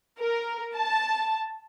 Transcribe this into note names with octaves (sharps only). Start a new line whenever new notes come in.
A#4
A5